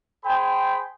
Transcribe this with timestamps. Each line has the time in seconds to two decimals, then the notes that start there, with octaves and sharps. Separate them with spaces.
0.25 G#4 C5 G5 G#5 B5